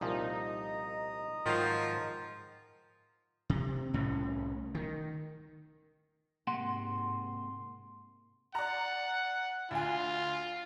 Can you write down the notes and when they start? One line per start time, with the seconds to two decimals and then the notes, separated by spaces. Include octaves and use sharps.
0.01 C2 A#2 F3 D#4 D#5 A#5 D#6
1.46 G#2 D#3 F3 F#3 F5
3.50 C3
3.94 C2 A2 C#4
4.75 D#3
6.47 G#2 C3 A#3 F#5 C6
8.55 D5 F#5 A#5
9.71 D2 F4 G#5